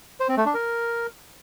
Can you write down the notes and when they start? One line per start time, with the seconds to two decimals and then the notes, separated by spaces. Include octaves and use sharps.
0.20 C5
0.29 C4
0.37 A3
0.46 D4
0.54 A#4